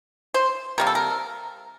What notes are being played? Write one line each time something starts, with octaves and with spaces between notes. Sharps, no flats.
C5
C3 G3 A#3 A#4
A4
A#4